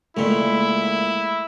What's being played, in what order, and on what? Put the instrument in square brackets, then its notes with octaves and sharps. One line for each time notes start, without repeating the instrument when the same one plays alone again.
[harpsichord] C#2 A#2 [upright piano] A3 [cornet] E4